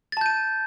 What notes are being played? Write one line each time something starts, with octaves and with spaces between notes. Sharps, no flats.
A5 G6 A6 D#7